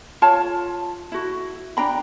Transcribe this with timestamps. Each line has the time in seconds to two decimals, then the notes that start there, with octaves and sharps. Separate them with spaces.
0.22 F4 C#5 A5
1.12 E4 F#4
1.77 D4 G5 A#5 B5